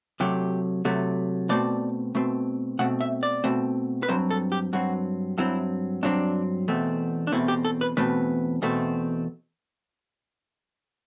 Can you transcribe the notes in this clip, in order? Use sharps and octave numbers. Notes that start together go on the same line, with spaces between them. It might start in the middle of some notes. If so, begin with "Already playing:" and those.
C3 F#3 A3 G4
C3 F#3 A3
B2 A3 C4 D5
B2 A3 C4
B2 A3 C4 F#5
E5
D5
B2 A3 C4
B4
G2 F#3 C4 C5
A4
G4
G2 F#3 C4 F#4
G2 F#3 C4 E4
G2 F#3 C4 D4
E2 B2 A3 C4
D4
E2 B2 A3 C4 E4
G4
A4
B4
E2 B2 A3 C4 B4
E2 B2 A3 C4